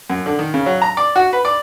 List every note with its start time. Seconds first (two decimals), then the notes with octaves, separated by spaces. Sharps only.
0.10 F#2
0.26 D3
0.39 D#3
0.54 C#3
0.66 F#3
0.82 A#5
0.97 D5
1.16 F#4
1.33 B4
1.45 D5